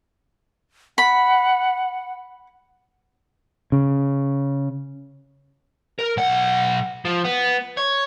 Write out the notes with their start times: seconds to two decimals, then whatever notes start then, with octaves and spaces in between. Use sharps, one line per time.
0.98 F#5 B5
3.72 C#3
5.99 A#4
6.17 B1 F#5
7.05 F3
7.24 B3
7.77 C#5